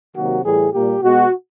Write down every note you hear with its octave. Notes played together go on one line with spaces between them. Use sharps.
C3 D#3 F#3 A#3 F#4
A2 E3 G3 G#4
A#2 G3 A#3 G4
B2 G#3 B3 F#4